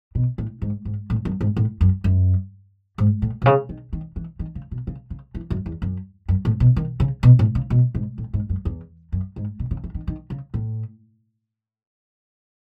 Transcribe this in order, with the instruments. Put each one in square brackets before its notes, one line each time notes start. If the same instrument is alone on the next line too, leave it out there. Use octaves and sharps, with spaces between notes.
[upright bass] B2
A2
G#2
G#2
A2
F#2
G#2
A2
F#2
F#2
G#2
A2
B2
C#3
D#3
D#3
E3
D#3
C#3
B2
C#3
C#3
E3
F#2
E2
F#2
F#2
A2
B2
D#3
C#3
B2
A2
C#3
B2
G#2
A2
G#2
F#2
E2
F#2
G#2
B2
C#3
E3
D#3
D#3
C#3
A2